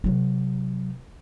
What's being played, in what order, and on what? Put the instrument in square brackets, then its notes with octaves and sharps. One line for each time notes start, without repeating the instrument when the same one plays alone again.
[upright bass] C3 F#3